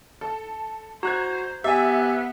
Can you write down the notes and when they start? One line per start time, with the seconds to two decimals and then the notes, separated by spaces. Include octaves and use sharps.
0.21 A4
1.03 F#4 C5 A#5 F#6 G#6
1.64 B3 G4 E5 G#5